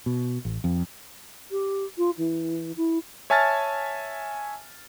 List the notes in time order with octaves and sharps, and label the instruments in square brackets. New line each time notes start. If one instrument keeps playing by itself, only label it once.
[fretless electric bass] B2
A1
F2
[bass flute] G4
F4
E3
E4
[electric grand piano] C#5 E5 G#5 A5 F6 A6